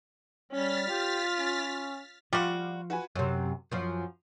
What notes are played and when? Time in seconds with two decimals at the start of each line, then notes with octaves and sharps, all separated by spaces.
0.52 G3 C#4 F6 A6 B6
0.89 F4 G4
1.37 C#4
2.33 F3 G3 F4 F#4 D6 C#7
2.90 F#4 B4 G#5
3.16 F#2 C3
3.72 F#2 F3